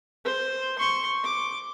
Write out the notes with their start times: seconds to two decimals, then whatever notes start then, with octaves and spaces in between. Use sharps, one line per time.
0.25 C5
0.79 C6 C#6
1.24 D6